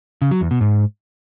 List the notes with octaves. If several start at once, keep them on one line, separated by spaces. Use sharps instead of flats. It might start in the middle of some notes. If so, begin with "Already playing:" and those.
C#3
F#3
E2
B2
G#2